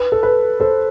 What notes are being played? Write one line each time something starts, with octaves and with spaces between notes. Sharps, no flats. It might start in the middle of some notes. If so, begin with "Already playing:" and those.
Already playing: B4
A4
B4
A4 C5